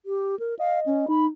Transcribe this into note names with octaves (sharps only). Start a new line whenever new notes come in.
G4
A#4
D#5 F5
C#4
D#4 B5